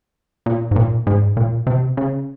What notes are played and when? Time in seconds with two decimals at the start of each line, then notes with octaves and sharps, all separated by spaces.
0.46 A#2
0.71 G#2
0.76 A#2
1.07 G#2
1.37 A#2
1.67 C3
1.97 C#3